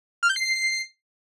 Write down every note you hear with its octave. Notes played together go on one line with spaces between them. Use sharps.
F6
G6
C7